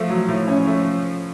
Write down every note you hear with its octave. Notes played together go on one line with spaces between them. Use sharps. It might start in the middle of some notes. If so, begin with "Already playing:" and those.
Already playing: F3 A3
F#3
A2
F3 C#4
A3